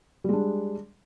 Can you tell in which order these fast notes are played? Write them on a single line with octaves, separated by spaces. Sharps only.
G3 G#3 D4